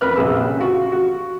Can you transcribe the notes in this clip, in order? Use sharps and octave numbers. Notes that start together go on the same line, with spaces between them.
F2 A#4 B4 B5 F6 F#6
A#1 C3 G#4 E6
C#3
F4 F#4
F#4